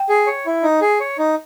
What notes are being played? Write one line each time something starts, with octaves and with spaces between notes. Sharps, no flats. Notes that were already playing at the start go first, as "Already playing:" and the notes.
Already playing: G5
G#4
C#5
E4
D#4
G#4
C#5
D#4